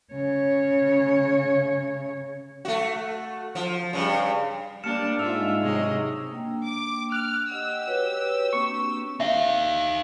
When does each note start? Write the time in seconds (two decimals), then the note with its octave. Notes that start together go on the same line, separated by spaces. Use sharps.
0.13 C#3 C#5
2.65 A3 F#4
3.55 F3
3.93 G2 C#3
4.84 G3 A#3 D4 A5 F6 C#7 E7
5.19 G#2 D4 F4 E5 E6 F7
5.61 C3 F#3 G#4 D#5
6.31 A#3 D4 G5
6.65 D6
7.12 F6 F#6
7.50 G4 D#5 F#5 E6
7.87 F#4 B4 C#5
8.53 A#3 C4 D4 C#6
9.20 D#4 E5 F5